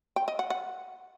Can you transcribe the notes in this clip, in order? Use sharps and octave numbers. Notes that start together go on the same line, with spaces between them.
G5
D#5
F#5
F#5